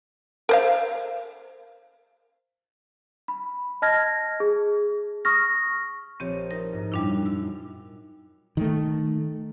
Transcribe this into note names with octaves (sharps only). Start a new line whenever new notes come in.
A#4 C5 F5
B5
D#5 A5 F6 G#6 A#6
G#4
C#6 D#6 F6 A#6
A#1 C4 G4 C#5
D#4 A#4
G#2
F#2 A#2 G3 D4 E4
E6
D#3 A3